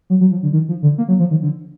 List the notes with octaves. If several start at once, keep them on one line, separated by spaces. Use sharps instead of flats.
F#3
F#3
F3
D3
D#3
F3
D3
A#3
F#3
F3
D#3
D3